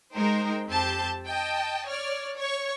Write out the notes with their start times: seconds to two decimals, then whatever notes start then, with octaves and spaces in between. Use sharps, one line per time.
0.13 G#3 D#4 A#4 C5 G5
0.67 F2 C4 G4 A5 G6
1.27 D#5 G5 A5
1.88 C#5 D5 F6
2.37 C#5 C#6